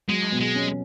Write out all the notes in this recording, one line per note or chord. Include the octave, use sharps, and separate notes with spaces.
F#3 G#3
B2
G#3
C#4